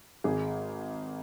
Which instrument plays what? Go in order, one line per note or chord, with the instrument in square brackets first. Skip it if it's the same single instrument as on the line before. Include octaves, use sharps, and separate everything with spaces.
[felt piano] G#1 G#4